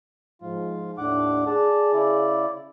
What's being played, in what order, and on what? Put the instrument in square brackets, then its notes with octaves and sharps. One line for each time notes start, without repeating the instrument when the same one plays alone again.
[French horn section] G#2 F3 [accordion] F4
[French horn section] D#2 D4 [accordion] A2 F#5 D6
[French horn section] G#4 [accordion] D5 A5
[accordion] C#3 E4 D5